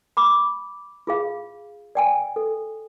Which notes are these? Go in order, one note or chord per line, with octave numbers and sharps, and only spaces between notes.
B5 D6
F4 G#4 F5
D5 G5 G#5
A4